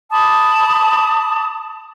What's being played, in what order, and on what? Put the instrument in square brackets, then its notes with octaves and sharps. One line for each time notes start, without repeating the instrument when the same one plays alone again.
[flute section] A5 B5 D6 D#6